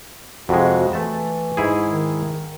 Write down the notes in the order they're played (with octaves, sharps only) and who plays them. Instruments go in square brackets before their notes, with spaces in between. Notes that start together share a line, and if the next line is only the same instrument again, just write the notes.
[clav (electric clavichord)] F2 C3 G#3 [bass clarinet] F#4
[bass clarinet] E3 [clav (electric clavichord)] A3 A5
[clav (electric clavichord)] G#2 E4 G#4
[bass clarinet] D#3